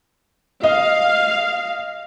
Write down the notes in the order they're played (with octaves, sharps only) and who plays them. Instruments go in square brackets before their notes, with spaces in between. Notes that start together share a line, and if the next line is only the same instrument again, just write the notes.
[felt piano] D#5 [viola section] F5